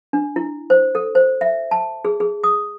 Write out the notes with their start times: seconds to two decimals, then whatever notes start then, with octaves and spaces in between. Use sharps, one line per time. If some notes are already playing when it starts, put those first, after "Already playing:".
0.13 D4
0.36 E4
0.70 C5
0.95 A4
1.15 C5
1.41 E5
1.71 A5
2.05 G#4
2.20 G#4
2.44 D#6